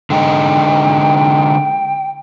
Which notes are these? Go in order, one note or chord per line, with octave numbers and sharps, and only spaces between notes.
D3 G#3 D#4 G5